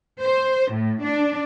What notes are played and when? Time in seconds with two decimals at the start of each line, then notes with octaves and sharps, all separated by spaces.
0.23 C5
0.72 A2
1.03 D4